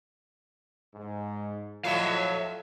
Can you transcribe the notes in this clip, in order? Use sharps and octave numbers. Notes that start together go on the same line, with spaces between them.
G#2
A2 F3 F#3 F4 A4 E5 F5